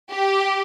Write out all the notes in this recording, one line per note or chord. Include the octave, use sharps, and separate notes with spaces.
G4